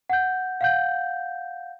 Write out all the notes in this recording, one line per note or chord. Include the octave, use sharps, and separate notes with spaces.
F#5 G6
F5 F#5 G6